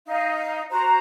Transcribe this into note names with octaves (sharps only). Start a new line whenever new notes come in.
D#4 F5
F#4 C5 A#5